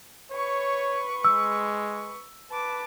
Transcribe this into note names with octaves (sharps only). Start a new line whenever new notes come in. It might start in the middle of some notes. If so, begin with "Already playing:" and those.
B4 C#5 C#6
G#3 E6
B4 A5 D6